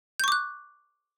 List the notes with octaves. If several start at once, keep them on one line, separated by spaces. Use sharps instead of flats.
C#6 D6 F#6 G6